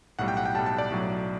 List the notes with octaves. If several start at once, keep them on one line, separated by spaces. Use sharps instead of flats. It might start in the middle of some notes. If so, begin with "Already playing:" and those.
B1 A2 G3 F#5
G5
F#5
G5
B1 A2 G3 A5
A5
D5
B1 A2 F#3